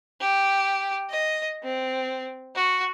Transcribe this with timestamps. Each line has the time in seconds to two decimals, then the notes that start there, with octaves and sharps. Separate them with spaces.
0.21 G4
1.10 D#5
1.63 C4
2.55 F#4